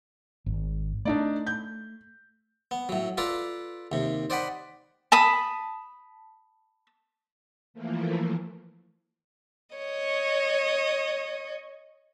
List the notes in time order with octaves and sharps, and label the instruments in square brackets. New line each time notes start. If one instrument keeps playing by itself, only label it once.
[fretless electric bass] G#1
[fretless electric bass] A3 [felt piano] D4 D#4 D5
[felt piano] G6
[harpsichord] B3
A2 F#3
F4 A4 B4 D5 A#5
D#2 C3
C5 D5 D#5 F#5 G5 B5
[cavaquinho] A5 B5 D#6
[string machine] E3 F3 A3 A#3
[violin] C#5 D#5